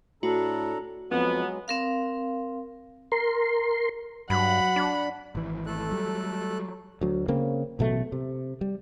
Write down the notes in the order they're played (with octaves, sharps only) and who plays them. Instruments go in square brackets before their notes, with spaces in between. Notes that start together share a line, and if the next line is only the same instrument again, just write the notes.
[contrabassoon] A2 [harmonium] D4 A4 A#5 [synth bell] F#4
[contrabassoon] F2 [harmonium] F#3 G#3 [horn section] B3
[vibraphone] C4 A#4 F5
[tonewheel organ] A#4 C6
[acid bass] G2 [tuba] F#3 [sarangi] F#5 [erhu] B5
[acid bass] D4
[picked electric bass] G#1 E3
[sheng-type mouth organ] A3 A4 F#6
[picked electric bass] F#3 G3
[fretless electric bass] D2 F#3
C#3 A#3 C4
A1 B2 F#3 A3
C3
G3